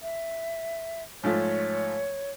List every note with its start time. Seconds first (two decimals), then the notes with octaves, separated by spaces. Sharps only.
0.02 E5
1.24 G#2 F3 A3 C#5